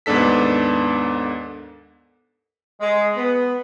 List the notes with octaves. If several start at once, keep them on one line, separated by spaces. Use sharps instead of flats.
D#2 G#2 B3 D4 A4 B6
G#3
B3